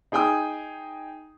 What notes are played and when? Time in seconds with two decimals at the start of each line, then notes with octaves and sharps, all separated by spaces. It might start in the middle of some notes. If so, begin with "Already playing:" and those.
0.12 D#4 G#4 G5 G#5 D#6